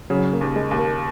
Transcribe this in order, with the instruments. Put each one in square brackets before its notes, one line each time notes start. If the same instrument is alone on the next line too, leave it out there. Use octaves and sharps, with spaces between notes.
[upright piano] C#3 [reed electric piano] F#3
[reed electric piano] A#3
[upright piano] D#2
[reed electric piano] G#3
[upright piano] D#2
[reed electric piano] A#3